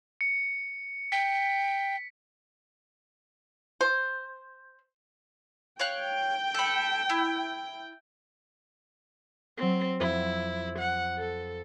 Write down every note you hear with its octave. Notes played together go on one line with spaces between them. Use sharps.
C#7
G5 B6
C5
C#5 F5 G5 F#6
A4 B5
E4
F#3 C4 D7
F2 E4
F#5
A4